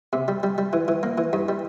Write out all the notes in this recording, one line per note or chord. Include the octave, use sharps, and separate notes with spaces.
C3
G3
G3
G3
E3
E3
A#3
E3
G2
G3